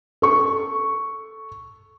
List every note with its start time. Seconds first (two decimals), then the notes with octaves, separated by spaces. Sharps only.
0.22 A4 C#6